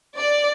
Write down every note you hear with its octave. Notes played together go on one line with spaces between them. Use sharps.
D5